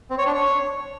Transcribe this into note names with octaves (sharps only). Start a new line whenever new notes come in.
C4
C#5
D4
C#5